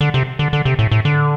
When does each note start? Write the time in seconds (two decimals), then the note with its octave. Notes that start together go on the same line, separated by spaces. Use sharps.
0.01 D3
0.14 C3
0.39 D3
0.53 D3
0.65 C3
0.79 A2
0.91 A2
1.05 D3